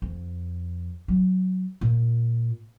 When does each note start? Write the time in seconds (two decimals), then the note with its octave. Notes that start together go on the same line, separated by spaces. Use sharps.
0.02 F2
1.08 F#3
1.81 A#2